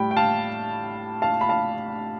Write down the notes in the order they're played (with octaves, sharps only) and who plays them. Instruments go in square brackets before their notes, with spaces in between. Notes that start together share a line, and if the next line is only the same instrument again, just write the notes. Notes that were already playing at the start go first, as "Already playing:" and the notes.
Already playing: [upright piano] A2 G3 G5 B5
G5
F5 A5
F5 A5
B5
F5 A5